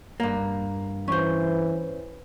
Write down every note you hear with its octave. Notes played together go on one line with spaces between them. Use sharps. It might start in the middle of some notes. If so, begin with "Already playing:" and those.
G2 A#3
E3 C#4 C5